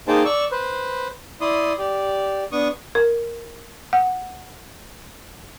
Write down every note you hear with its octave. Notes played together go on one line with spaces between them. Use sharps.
A#3 D#4 G#4 C5 G5 A5
D5 C#6 E6
B4 C5
E4 D5 C6 D#6
G4 D5
B3 D4 C#6 D#6
A#4
F#5